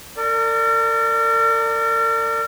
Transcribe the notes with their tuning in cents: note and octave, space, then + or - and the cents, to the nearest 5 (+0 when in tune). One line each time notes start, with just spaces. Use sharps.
A#4 -40 D5 +0